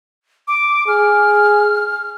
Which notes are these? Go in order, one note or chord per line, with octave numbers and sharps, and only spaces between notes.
D6
G#4 F6